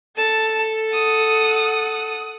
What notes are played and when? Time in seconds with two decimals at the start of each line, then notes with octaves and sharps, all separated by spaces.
0.17 A4 A5
0.91 F#5 D#6